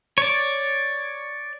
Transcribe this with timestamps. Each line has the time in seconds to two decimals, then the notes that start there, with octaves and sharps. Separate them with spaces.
0.18 C#5 D5